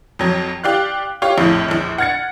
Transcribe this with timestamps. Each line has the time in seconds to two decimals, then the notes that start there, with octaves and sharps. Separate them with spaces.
0.19 F2 F#3
0.64 G4 D5 F5 F#6
1.22 F4 G4 C#5 F5
1.38 A#1 F2 A2
1.68 A#1 E2
1.98 F#5 F6 G#6 A6 C#7